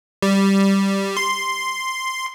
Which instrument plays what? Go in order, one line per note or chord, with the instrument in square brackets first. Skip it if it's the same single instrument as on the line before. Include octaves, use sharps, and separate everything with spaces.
[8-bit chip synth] G3
C6